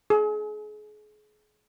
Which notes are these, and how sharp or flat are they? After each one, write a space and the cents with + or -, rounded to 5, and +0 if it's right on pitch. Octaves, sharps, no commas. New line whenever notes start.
G#4 +35